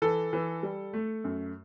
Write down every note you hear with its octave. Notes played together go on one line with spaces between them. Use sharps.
E3 A4
E3
G3
A3
F#2